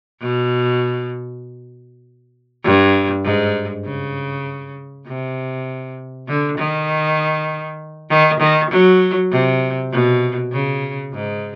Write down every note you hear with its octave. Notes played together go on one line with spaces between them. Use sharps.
B2
G2
G#2
C#3
C3
D3
D#3
D#3
D#3
F#3
C3
B2
C#3
G#2